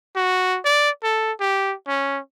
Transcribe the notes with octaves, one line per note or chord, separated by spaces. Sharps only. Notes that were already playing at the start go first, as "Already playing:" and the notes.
F#4
D5
A4
G4
C#4